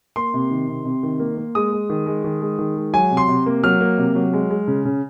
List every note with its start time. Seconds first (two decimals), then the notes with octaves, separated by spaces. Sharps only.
0.16 A#3 C6
0.34 C3
0.50 D#3
0.68 C3
0.85 C3
1.03 D#3
1.20 A#3
1.38 A#3
1.55 G#3 D#6
1.73 G#3
1.90 D#3
2.06 G#3
2.24 D#3
2.42 G#3
2.59 D#3
2.77 G#3
2.93 F#3 G#5
3.11 C3
3.17 C6
3.29 C3
3.46 A#3
3.63 F#3 F6
3.81 A#3
3.98 C3
4.15 F#3
4.33 G#3
4.50 G#3
4.68 C#3
4.85 C#3